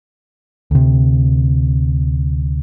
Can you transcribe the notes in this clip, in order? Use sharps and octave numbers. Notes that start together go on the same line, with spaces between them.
D2 C3